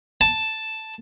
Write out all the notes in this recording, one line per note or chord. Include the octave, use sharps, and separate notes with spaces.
A5